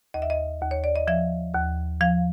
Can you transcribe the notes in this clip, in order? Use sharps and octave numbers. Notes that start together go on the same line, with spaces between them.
D#2 D#5
E5
D#5
D#2
C#5
D5
D#5
F3 E5
D#2
F3 F5